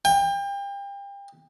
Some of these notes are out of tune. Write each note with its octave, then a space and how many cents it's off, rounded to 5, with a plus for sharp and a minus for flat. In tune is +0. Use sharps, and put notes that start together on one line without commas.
G5 +30